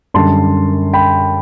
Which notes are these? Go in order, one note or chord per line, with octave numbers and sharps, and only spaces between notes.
F#2 D3 G3 A5 C6
G5 B5